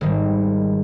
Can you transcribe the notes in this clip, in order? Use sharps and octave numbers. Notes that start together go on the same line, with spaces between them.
G#1 G#2 D#3 G3